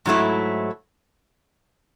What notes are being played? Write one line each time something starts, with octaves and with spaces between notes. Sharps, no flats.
G#2 F#3 A3 E4